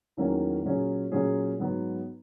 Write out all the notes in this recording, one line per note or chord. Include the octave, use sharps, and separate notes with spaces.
E2 D#3 F#3 A#3 C#4
A#2 F#3 C#4 G#4
A#2 F#3 C#4 G#4
G#2 F#3 B3